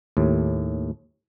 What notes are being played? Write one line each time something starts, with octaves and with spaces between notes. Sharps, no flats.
D#2 A2